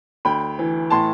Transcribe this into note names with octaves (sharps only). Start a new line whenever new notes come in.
D2 G5 B5
E3
A2 A5 C6